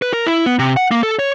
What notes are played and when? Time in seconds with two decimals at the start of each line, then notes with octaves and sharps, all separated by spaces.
0.02 B4
0.13 A#4
0.26 E4
0.46 B3
0.59 C3
0.77 F#5
0.91 A#3
1.03 A4
1.19 C#5